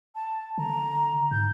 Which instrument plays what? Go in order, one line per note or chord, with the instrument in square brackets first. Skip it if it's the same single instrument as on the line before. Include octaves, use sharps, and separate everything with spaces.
[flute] A5
[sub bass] D3 [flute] A#5
[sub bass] G#2 [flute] G6